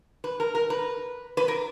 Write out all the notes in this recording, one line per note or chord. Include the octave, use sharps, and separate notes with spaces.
B4
A#4
A#4
B4
B4
A#4